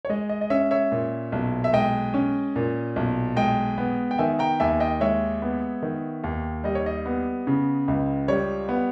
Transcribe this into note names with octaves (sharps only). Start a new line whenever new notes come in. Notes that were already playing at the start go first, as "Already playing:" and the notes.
C#5
G#3 D#5
D#5
D#5
C#4 C#5 E5
C#5 E5
A#2
B1
E5
G#3 D#5 G5
C#4
A#2
B1
G#3 D#5 G5
B3
G5
D#3 E5 G#5
G5 A#5
D#2 E5 G#5
D#5 G5
G#3 C#5 E5
B3
D#3
D#2
G3 D#5
C#5
D#5
B3
C#3
C#2
G3 C#5
B3